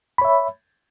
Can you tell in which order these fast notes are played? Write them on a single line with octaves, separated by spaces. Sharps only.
B5 C#5 E5